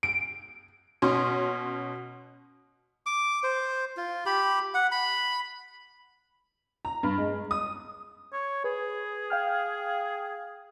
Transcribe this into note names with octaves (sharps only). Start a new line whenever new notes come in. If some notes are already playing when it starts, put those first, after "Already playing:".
D7
B2 C#4 C6
D6
C5
F4
G4 B5
F#5
B5
A#5
G2
G#3
D#6
C#5
G#4 B4
F5 G5 F6